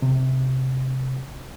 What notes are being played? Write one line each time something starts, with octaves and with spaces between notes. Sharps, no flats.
C3